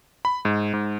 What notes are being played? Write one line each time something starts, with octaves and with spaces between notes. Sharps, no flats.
B5
G#2
G#2